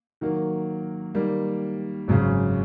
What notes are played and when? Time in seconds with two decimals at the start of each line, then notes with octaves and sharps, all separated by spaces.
0.21 D#3 F#3 A#3
1.15 D#3 G3 A#3
2.08 G#1 F#2 C#3